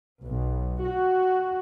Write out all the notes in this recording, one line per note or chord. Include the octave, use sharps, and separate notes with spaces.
B1
F#4